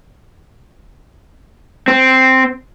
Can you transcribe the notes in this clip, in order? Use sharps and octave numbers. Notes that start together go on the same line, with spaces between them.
C4